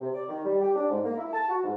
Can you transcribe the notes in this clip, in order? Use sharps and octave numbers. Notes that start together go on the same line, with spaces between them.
C3
D5
D#3
G3
G4
D4
G#2
A#3
E4
A5
F#4
G#2